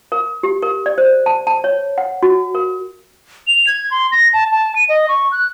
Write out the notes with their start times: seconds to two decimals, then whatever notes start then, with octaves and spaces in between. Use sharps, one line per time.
0.12 A#4
0.43 G4
0.62 A#4
0.86 D5
0.98 C5
1.26 A5
1.47 A5
1.64 C#5
1.98 F#5
2.23 F#4
2.55 A#4
3.47 F7
3.67 G#6
3.91 C6
4.12 A#6
4.33 A5
4.51 A5
4.76 D#7
4.89 D#5
5.09 C#6
5.32 F#6